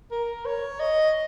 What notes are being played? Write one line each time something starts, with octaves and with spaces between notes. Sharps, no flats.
A#4
C#5
D#5